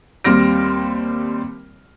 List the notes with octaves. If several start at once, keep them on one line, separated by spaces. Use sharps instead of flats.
D#2 G3 C4 F6 A#6 D7